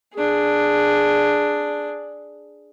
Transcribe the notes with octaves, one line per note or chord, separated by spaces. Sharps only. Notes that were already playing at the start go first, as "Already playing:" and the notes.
D4 G#4